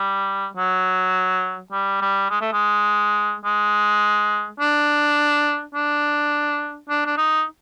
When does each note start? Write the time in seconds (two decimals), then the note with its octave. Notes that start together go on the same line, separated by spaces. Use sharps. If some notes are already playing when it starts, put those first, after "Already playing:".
Already playing: G3
0.57 F#3
1.72 G3
2.01 G3
2.30 G#3
2.41 A3
2.52 G#3
3.45 G#3
4.60 D4
5.74 D4
6.89 D4
7.06 D4
7.17 D#4